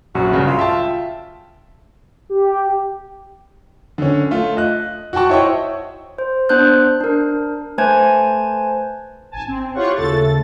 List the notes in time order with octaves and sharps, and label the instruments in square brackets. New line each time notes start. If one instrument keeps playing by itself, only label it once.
[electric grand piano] A#1 F#2 [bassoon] F#4
[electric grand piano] G2 C#3
[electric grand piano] C#2 [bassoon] F4
[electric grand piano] E5 G5 A5
[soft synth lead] G4
[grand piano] D3 C#4
A3 F4
D#5 F#6
F#4 F#5 G5 A5 C#6
E4 C5 C#5 D#5 G5 C#6
[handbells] C5
B3 D4 C5 F#6 G6
D4 A#4
A3 B4 C5 G#5 A5 G#6
[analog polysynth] G#1 G#5 A5
C4
E4 F4 G4 C#5 F#5 C#6
D#2 C#3 A3 A4 A6